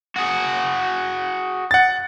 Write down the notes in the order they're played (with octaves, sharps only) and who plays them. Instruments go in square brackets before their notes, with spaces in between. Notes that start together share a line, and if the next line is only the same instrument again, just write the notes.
[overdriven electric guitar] F#4 G#4
[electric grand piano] F#5 A6